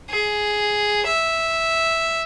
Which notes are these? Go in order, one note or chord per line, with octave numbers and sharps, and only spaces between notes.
G#4
E5